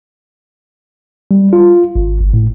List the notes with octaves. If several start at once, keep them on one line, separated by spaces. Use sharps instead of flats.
G3
F4
G#1
G1
A2